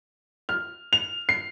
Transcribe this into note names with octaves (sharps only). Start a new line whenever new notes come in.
F6
F7
C7